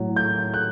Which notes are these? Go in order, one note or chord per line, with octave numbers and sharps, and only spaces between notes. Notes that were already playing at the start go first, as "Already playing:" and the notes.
Already playing: A2 F#3
G6
F#6